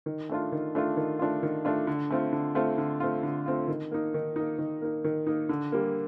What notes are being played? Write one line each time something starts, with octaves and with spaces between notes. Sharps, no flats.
D#3
A3 D4 F4
D#3
A3 D4 F4
D#3
A3 D4 F4
D#3
A3 D4 F4
D3
A3 C4 F4
D3
A3 C4 F4
D3
A3 C4 F4
D3
A3 C4 F4
D#3
A#3 D#4
D#3
A#3 D#4
D#3
A#3 D#4
D#3
A#3 D#4
D3
G3 A#3